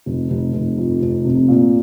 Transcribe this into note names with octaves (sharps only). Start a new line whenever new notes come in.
F1
F1
F1
F2
F1
C3
A#2